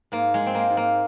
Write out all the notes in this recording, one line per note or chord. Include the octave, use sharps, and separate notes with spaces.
G#2 A#3
G#3
G#2
C4
A#3
G#2
A#3